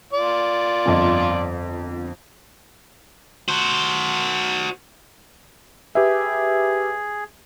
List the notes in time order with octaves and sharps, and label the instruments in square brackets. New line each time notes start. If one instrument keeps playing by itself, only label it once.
[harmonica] F4 D5
[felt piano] G1 F2 D#5
[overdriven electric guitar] F#4 C5
[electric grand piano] G4 B4 E5 [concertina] G#4